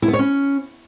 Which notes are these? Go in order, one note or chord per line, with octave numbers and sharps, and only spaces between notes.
E4
B3
C#5
C#4